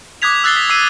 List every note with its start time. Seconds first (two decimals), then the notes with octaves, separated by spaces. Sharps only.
0.22 D6 D#6 F#6 G#6 B6 F7
0.44 E6 F#6 A6 C7 G7
0.56 B6
0.70 E6 C7 D#7